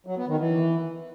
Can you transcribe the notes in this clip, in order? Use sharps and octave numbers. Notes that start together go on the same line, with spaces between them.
F#3
B3
D#3
E3